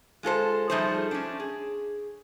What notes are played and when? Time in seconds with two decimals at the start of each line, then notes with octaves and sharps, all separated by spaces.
0.23 G#3 F4 A4 C5
0.70 F3 G3 A3 D#4 G#4 C5
1.11 C#4 D4
1.40 G#4